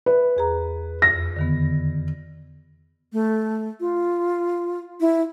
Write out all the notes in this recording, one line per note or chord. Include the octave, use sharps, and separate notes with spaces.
B4 E5
E2 G#4 A#5
F2 A#6
D3 D#3 B3
A3
F4
E4